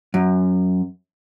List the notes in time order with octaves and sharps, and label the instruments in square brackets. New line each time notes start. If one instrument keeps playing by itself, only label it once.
[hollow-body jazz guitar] F#2